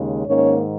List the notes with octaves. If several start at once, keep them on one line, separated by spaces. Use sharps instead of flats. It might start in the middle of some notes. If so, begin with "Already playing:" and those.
Already playing: D#2 C#3 G#3
G#2 D#3 A#3 C#4 C#5